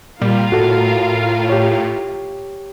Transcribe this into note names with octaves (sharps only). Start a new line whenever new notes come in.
A#2 G3 F4 A#4 F5
A2 F#4 A4
G4 C#5